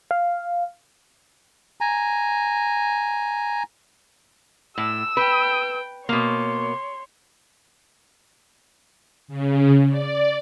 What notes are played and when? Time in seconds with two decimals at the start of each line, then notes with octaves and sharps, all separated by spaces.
0.11 F5
1.81 G#5 A#5
4.78 A2 E6
5.17 B4 G5
6.09 B2 A#3 C#5 C6
9.28 C#3
9.90 D5